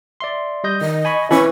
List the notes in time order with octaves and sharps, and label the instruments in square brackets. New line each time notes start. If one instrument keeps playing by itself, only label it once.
[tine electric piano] D5 E5 C6
G3 D#5 G6
[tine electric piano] D#3 [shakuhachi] D#5
[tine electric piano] G#5 B5 C#6
[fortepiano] E3 [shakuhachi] C#4 [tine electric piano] B5 C#6